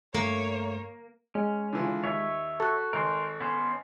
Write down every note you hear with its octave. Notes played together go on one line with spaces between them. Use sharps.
G2 A3 A#3 C#5
G#3 C#4
D3 E3 F4
D#2 C#5 E5
F#4 A4 C#6 F#6
G#1 A#4 C5
B3 C#4 C5